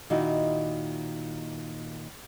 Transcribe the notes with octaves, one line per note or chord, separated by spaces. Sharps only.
A#2 D#3 D#4 E4 F#4